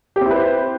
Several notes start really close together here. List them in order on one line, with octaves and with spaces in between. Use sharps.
G4 C4 E4 B4 C5